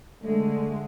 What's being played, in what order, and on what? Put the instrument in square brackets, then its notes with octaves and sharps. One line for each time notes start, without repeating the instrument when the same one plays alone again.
[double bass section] D3 [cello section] G#3 [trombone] A3